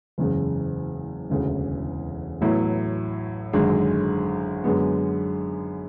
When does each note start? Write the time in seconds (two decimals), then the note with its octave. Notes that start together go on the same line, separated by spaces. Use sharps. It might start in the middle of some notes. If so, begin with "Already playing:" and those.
0.18 F#1 E2 C#3 G#3
1.30 E1 D2 C#3 E3
2.41 A1 A2 F#3 B3 E4
3.53 G#1 F#2 D3 G#3
4.64 F#2 D3 G#3 B3